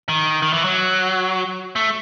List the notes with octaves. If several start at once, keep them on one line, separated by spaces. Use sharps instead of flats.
D#3
D#3
E3
F#3
A3